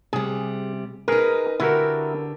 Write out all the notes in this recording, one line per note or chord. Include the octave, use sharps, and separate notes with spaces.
C3 G3 G#4
D#4 G#4 A#4 B4
D3 E4 F#4 G4 A#4